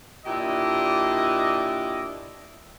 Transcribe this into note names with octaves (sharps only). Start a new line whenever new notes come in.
A#2 D4 E4 G4 D#5